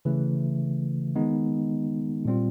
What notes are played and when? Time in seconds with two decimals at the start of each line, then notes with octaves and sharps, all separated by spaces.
0.05 C#3 E3 A3
1.15 D#3 G#3 B3 D#4
2.25 A#2 G3 C4 F4